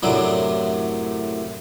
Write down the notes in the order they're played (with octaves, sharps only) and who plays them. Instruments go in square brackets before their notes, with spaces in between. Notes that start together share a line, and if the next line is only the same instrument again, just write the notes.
[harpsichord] F#2 A2 C3 F#3 D4